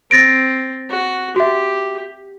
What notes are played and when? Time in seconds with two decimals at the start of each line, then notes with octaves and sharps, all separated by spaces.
0.11 C4 A6 A#6 D7
0.90 F#4
1.36 F#4 G4 E5